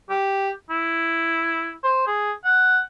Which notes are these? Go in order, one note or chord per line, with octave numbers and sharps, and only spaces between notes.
G4
E4
C5
G#4
F#5